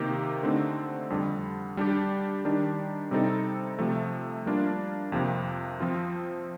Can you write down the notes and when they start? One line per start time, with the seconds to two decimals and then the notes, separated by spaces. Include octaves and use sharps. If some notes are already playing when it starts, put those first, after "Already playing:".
Already playing: C3 D#3 A#3 D#4 G4
0.43 D3 A3 C4 D#4
1.10 F2 D3 G3
1.77 G3 D4 G4
2.45 D#3 G3 D4 G4
3.11 C3 G3 C4 D#4 A4
3.79 C3 F3 A3
4.46 G3 A#3 D4 F4
5.12 F2 C3 F3 A#3
5.80 F3 C4 F4